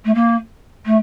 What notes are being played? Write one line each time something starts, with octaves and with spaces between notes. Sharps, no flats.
A3
A#3
A3